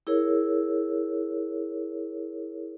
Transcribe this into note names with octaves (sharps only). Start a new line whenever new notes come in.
E4 G#4 A#4 C#5